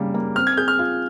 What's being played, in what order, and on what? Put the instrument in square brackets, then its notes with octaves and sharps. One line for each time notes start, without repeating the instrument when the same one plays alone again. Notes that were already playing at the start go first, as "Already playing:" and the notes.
Already playing: [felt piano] C#3 G3 A#3
A#3
[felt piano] C4 [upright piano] F6
[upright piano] G#6
[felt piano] G#4 [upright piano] G6
[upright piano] F6
[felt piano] F4